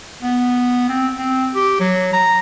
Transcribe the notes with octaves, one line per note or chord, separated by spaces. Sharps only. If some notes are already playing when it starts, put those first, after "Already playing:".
B3
C4
C4
G4
F#3
A#5